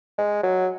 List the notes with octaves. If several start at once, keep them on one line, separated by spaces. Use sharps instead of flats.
G#3
F#3